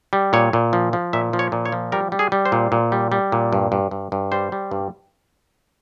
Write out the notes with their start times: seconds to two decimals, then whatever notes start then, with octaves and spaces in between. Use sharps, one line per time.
0.13 G3
0.33 A#2 C#5
0.53 A#2
0.73 F3
0.93 F3
1.13 A#2 E5
1.33 F3
1.39 C#5
1.52 A#2
1.65 C#5
1.72 F3
1.92 G3 A#4
2.12 G3
2.19 G#4
2.32 G3
2.45 C5
2.52 A#2
2.72 A#2
2.92 G3
3.12 G3
3.32 A#2
3.53 G2
3.72 G2
3.91 G2
4.12 G2
4.32 G3 C5
4.52 G3
4.71 G2